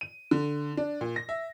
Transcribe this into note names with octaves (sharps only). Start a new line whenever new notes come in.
D#7
D3
D4
A#2
A#6
E5